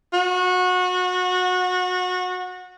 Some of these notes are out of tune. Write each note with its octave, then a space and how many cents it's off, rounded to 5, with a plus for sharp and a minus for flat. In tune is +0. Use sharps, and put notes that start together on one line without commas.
F#4 -25